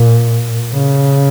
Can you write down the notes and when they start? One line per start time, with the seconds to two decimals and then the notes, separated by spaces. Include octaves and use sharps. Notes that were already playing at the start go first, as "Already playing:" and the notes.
Already playing: A#2
0.73 C#3